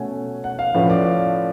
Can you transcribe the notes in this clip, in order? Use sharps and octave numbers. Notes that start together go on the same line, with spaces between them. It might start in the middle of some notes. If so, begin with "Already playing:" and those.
Already playing: B2 A3 C#4 F#5 G#5
F#5
F5
A2 F3 A3 C#4 B4
D5
F5